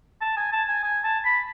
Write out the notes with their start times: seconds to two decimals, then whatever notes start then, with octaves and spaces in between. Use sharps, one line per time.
0.21 A5
0.37 G#5
0.53 A5
0.69 G#5
0.83 G#5
1.04 A5
1.25 B5